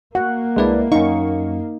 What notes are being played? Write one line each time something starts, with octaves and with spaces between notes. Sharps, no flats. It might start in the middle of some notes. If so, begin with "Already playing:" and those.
A#3 F#4 F#5
C2 G#3 D4 E4 B4 D5
F#2 D#4 F5 C#6